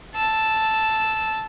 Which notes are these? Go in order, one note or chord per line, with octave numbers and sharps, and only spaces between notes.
A5 E6